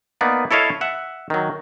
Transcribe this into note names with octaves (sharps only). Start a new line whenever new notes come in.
A#3 B3 D#4 D5
E4 A4 C#5 D#5 F5
E5 F#5
D#3 F#3